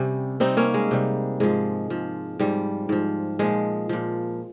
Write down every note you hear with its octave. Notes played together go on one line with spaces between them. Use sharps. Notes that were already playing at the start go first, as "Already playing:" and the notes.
Already playing: C3 G3 C#4
C3 G3 C4 D#4
A#3 C#4
G#3
C3 G3
G#2 F3 G#3
G#2 F3
G#2 F3 G3
G#2 F3
A#2 F3 G#3
A#2 F3